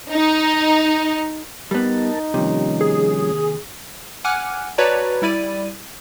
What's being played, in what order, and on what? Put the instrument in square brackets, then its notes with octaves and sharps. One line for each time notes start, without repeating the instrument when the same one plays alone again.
[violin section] D#4
[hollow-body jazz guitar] G3 B3 [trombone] D#4 [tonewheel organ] A#4 A5
[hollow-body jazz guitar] D#2 C3 [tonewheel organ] F3 G3 C#4
[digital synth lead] G#4
[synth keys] F#5 G#5 D6 F6 F#6
F#4 B4 C#5 D5 A5 A#5
G3 E4 D5 D#7